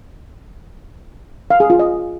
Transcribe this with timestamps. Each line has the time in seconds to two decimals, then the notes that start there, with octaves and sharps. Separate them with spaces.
1.50 F5
1.60 G#4
1.70 F4
1.79 D#5